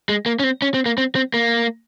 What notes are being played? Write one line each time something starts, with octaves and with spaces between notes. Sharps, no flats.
G#3
A#3
C#4
C4
C#4
C4
A#3
C4
C4
A#3